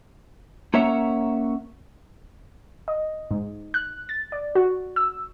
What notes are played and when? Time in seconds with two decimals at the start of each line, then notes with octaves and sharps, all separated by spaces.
0.74 A#3 C#4 A#4 C#5 E5 F#5
2.88 D#5
3.31 G#2
3.74 F#6
4.09 A6
4.32 D5
4.55 F#4
4.96 E6